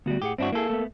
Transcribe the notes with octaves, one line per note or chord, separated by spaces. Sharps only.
D2 G3 B3 F#4
A2 G4 G#4 F#5
G2 C4 D4 E4 F#4
A#3 E4 G#4 A4
A3 B3